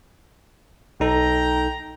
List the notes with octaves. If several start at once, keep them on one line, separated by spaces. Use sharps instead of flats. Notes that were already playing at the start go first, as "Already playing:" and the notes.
B1 D#4 A4 G5 A#5